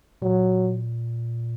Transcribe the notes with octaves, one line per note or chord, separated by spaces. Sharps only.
A#2 F#3